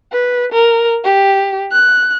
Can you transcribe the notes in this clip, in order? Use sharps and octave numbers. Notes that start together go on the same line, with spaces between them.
B4
A#4
G4
F#6